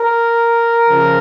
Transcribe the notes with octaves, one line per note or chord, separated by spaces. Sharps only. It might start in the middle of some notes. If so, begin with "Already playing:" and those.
Already playing: A#4
C#3 F3